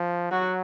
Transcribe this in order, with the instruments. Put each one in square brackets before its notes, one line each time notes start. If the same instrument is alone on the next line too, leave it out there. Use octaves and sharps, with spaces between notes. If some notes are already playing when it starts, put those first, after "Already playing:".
Already playing: [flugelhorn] F3
[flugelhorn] F#3 [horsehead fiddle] F#4